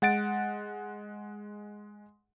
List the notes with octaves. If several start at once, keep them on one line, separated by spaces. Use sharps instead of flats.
G#3 F#5 A6 D7